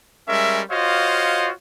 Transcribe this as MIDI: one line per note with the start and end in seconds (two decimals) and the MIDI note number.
0.28 0.61 55
0.28 0.61 56
0.28 0.61 61
0.28 0.61 70
0.28 0.61 76
0.71 1.51 65
0.71 1.51 66
0.71 1.51 72
0.71 1.51 73
0.71 1.51 75
0.71 1.51 77